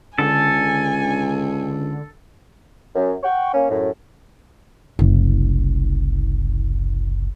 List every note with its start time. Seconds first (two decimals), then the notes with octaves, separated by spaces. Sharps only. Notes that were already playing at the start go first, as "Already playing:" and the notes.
0.18 C#2 D3 A4 G#5
2.95 F#2
3.24 F#5 G5 C#6
3.54 A#3 C#4
3.70 F#2 A2
4.99 F#1 C2